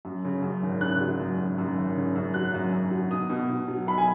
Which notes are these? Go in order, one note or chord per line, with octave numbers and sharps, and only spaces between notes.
F#2
C#3
F#2
G#1
C#3 F#6
F#3
F#2
F#2
F#2
G#1
C#3
F#2
F#3 F#6
F#2
F#2
F#3
B2 D#6
B2
B2
F#3
B1 B5
G#5